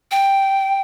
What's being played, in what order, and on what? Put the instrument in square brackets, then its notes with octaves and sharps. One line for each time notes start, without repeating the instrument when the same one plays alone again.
[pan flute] G5